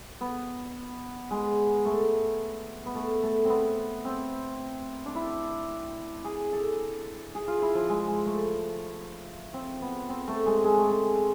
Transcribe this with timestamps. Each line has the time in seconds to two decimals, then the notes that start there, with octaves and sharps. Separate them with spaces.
0.21 B3
1.31 G#3
1.85 A3
2.86 B3
2.95 A3
3.23 A3
3.45 B3 C4
4.05 C4
5.06 D4
5.15 E4
6.24 G#4
6.52 A4
7.35 G#4
7.48 F4
7.62 E4
7.75 F3
7.89 G#3
8.07 G#3
8.26 A3
9.54 C4
9.82 B3
10.09 C4
10.28 A3
10.46 G#3
10.64 G#3
10.77 A3
10.90 G#3